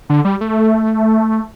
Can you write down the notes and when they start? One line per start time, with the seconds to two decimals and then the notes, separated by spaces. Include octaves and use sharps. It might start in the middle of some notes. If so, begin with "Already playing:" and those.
0.10 D3
0.25 G3
0.41 A3